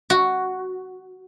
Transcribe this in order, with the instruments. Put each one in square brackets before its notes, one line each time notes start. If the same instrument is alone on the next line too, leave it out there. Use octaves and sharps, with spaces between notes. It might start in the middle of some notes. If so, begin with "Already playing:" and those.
[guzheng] F#4